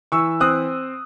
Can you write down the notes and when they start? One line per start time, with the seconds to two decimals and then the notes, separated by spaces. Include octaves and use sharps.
0.12 E3 C#6 E6
0.40 C4 D#6 F#6